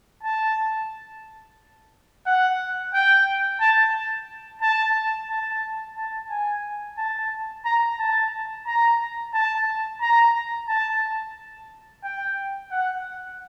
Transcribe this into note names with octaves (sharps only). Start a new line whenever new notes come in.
A5
F#5
G5
A5
A5
A5
A5
G#5
A5
A#5
A5
A#5
A5
A#5
A5
G5
F#5